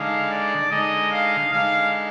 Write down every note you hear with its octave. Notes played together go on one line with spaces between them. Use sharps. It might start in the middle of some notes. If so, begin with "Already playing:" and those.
Already playing: D3 G#3 D#4 F5
D5
D3 G#3 D#4 D#5
F5
D3 G#3 D#4 F5